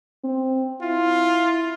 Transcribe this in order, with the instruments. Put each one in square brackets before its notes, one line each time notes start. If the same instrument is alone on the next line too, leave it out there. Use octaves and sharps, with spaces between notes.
[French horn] C4
[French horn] E4 [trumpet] F4